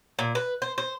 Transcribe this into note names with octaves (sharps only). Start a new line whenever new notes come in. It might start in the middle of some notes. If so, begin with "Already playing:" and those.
A#2
B4
C5
C5